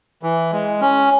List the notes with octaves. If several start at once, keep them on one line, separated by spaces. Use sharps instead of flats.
E3
G#3
C#4